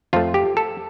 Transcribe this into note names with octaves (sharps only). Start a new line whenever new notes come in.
F2 F3 A3 F4
G4
A4